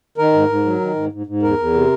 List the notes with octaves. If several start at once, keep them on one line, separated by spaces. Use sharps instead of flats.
D#3 A#4
G#2
G#2
F#3
D#3
G#2
G#2
G#2
E2 A#4
E2
C3